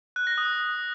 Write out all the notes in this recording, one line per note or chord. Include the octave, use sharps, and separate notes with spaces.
F#6
A#6
D#6